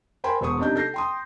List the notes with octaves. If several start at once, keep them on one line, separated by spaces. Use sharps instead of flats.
A#4 C5 G5 G#5 B5 C6
E1 B3 C5 C#6 D#6
C3 D4 D#4 D#5 G6
A4 G6 A#6 C7
G5 C6 D#6